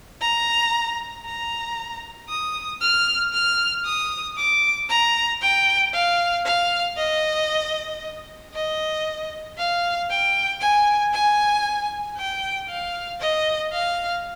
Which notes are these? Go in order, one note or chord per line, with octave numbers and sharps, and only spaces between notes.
A#5
A#5
D#6
F6
F6
D#6
D6
A#5
G5
F5
F5
D#5
D#5
F5
G5
G#5
G#5
G5
F5
D#5
F5